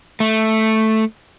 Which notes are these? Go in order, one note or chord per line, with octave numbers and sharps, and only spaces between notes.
A3